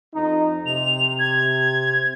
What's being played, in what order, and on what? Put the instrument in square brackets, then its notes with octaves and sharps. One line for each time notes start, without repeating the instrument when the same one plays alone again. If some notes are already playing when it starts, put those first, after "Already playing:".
[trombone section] F2 D#4
[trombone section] C3 [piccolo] F7
[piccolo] G#6